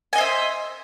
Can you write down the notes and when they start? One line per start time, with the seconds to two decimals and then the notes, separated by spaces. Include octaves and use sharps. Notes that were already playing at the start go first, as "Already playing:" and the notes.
0.13 G#5
0.15 D#5
0.18 C5
0.21 E5